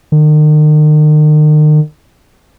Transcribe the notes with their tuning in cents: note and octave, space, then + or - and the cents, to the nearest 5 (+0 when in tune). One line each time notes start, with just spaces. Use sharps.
D#3 -40